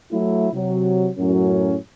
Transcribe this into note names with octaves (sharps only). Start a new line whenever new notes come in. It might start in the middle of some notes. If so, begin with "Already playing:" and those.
F#3 A3 E4
C3 F#3
F#2 A2 F#3 C#4